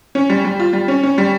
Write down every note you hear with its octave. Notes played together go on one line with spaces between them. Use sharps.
C#4
G3
G3
F4
G3
C#4
C#4
G3